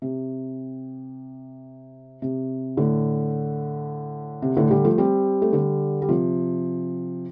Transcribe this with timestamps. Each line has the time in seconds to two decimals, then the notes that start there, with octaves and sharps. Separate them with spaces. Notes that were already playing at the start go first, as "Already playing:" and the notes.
0.02 C3
2.22 C3
2.77 A2 D3
4.42 C3
4.57 A2 D3
4.71 D3 G3
4.84 F3 A3
4.98 G3 C4
5.42 A3
5.53 D3 G3
6.02 G3
6.08 C3 F3